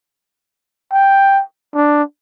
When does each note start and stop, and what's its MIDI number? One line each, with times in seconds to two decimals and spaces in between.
0.92 1.42 79
1.74 2.03 62